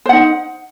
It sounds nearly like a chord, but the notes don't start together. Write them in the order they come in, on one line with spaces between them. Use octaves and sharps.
C5 F#5 D#4